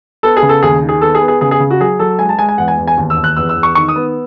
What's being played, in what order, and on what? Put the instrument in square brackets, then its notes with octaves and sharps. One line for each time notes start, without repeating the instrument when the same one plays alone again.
[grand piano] B3 A4
G#4
C#3
A4
D#2 G#4
D#3
G#4
B3 A4
G#4
B3
G#4
C#3 G#4
G#4
C#3
F#4
F#3 G#4
F#3 A4
G#3 G#5
A5
G#3 G#5
G#5
E2 F#5
G#5
E2
G#5
D#2
E6
D#2
F#6
E2 E6
E6
E2
C#6
D#3 C#6
D#6
B3